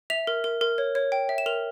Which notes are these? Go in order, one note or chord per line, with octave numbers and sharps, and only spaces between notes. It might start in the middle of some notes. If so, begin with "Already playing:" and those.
E5 F7
A#4
A#4
A#4
C#5
C#5
G5
E5
E7
A#4 F7